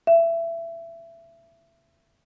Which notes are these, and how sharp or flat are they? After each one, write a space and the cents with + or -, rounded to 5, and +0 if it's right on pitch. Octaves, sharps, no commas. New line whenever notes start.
E5 +20